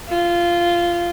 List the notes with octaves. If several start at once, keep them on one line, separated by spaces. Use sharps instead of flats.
F4